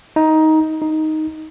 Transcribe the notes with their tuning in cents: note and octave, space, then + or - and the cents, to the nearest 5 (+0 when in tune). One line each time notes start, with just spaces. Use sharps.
D#4 +15
D#4 +5